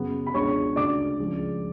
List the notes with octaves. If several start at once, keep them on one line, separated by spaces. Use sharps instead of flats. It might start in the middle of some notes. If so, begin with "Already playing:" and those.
Already playing: F#2 C#3 F#3 B3
B5
C#2 B2 G#3 B3 D4 C#5 C#6
D2 C#3 G#3 D4 D5 D6
C#2 C#3 F3